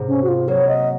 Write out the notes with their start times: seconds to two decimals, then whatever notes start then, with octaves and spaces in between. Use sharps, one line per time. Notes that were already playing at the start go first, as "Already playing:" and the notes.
Already playing: G#2 C3
0.08 C#4
0.23 F#4
0.28 F4
0.48 F#3 A#3 C#5
0.68 D#5